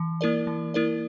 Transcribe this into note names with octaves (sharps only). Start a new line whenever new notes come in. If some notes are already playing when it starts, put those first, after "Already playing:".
Already playing: E3
A#3 E4 A#4 D5
E3
A#3 E4 A#4 D5